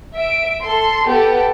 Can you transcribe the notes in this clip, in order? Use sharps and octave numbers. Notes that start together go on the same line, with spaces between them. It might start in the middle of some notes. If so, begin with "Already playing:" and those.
E5 D7
A4 C6
B3 G4 A4